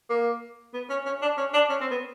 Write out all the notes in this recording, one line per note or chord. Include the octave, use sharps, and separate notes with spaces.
A#3
B3
C#4
C#4
D4
C#4
D4
C#4
C4
B3